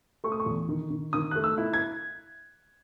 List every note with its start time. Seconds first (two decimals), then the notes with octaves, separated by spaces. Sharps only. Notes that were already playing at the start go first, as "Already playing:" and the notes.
0.24 A3 C#6
0.32 D#6
0.40 C#6
0.46 E2
0.69 D#3
0.90 D#3
1.13 D#3 D#6
1.31 A3 F#6
1.44 E6
1.58 E4
1.73 G#6